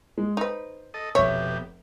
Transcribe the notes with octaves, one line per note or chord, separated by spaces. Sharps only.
G#3
D#4 B4 C5
A4 D#5
F1 B2 G4 C#5 E5